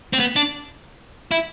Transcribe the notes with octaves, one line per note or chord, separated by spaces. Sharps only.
C4
B3
D4
E4